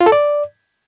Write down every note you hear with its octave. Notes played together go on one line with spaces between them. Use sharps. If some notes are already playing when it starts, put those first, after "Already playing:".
F4
A4
D5